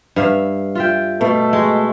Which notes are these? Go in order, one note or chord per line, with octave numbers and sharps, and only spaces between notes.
G2 E5 F5
F4 E5 G5
B2 A3
G#3